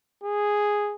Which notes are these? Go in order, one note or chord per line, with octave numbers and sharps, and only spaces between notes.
G#4